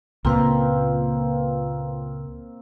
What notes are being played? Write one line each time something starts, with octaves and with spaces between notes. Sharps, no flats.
C#2 A#2 A#3 C4 F4 B4 F5